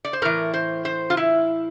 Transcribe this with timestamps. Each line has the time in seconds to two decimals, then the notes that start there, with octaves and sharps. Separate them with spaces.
0.05 D5
0.13 C5
0.22 A2 E3 A#4
0.54 C5
0.85 C5
1.10 F4
1.17 E4